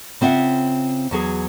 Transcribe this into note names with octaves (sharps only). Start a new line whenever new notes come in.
C#3 C4 F4 E5 F#5
E2 F#3 G#4